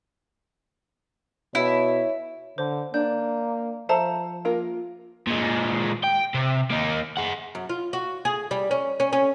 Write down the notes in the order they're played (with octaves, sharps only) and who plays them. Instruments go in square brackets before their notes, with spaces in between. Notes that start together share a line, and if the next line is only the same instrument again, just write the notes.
[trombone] B2 [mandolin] E4 [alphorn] C#5
[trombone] D3 [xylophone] C5
[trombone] A#3 [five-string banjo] D4 [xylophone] G6
[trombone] F3 [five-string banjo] A4 C5 E5 [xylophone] F5 A5 A#5
[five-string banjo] A#3 F4 A#4
[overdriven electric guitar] A#2 G#3
G5
C3
A#3 D#4
G#4 F#5
[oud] F#2
F4
F#4
G#4
G3
C#4
C#4
C#4